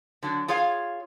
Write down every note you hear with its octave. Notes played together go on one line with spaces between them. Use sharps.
D3 F#3 D4
F4 G#4 C#5 F5